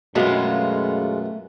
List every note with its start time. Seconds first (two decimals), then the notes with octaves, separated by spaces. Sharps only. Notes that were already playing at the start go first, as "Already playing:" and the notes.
0.16 F#2 B2 G#3 A3 F4 B4 F5